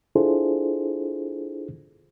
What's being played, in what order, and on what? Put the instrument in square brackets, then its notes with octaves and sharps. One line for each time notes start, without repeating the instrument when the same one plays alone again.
[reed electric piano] D4 E4 F4 G#4 A4 C5